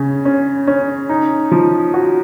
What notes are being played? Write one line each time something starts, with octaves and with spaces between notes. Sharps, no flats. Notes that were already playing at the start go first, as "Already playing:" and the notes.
Already playing: C#3 C#4
C#4
C#4
D#4
F3
F#4